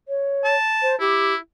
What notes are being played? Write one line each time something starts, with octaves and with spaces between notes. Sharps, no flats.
C#5
A5
C5
E4 G4